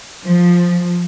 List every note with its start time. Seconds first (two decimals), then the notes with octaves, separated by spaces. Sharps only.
0.24 F3